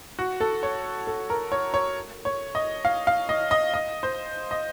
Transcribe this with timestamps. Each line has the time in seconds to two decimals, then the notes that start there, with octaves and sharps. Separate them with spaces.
0.19 F#4
0.40 A4
0.63 C#5
1.07 A4
1.30 A#4
1.52 C#5
1.74 C#5
2.25 C#5
2.55 D#5
2.85 F5
3.07 F5
3.29 D#5
3.51 D#5
3.74 D#5
4.03 C5
4.51 D#5